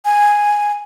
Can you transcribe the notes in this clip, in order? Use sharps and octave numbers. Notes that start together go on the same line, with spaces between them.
G#5